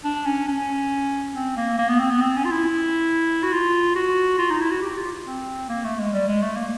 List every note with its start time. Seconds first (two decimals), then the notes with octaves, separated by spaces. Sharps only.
0.04 D4
0.26 C#4
0.48 C#4
1.35 C4
1.57 A#3
1.78 A#3
1.89 B3
2.00 C4
2.10 B3
2.22 C4
2.36 C#4
2.45 F4
2.51 E4
3.43 F#4
3.52 F4
3.95 F#4
4.38 F4
4.50 D#4
4.60 E4
4.71 F#4
4.82 G4
4.97 F4
5.26 C4
5.69 A#3
5.84 A3
5.99 G#3
6.13 G3
6.28 G#3
6.42 A3
6.56 A#3